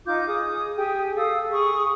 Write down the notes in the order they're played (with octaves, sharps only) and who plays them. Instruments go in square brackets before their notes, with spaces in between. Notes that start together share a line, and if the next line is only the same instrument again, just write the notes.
[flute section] D#4 F4 D6 G6
G#4 D#6
G4 G#4 G5 G#5
A4 F5 D#6 E6
G#4 C#6 D#6